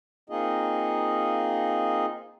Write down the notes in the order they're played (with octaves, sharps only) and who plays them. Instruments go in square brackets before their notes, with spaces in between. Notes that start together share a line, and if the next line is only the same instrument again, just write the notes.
[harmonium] A#3 C4 D#4 F4 G#4 D#5